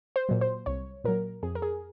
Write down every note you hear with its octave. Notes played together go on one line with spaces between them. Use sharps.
C5
A#2 F#3
C5
C2 C#5
A#2 F#3 A#4
F2 G#4
A#4
G#4